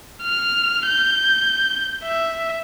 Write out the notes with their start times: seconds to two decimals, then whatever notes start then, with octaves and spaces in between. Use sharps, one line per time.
0.22 F6
0.86 G6
2.04 E5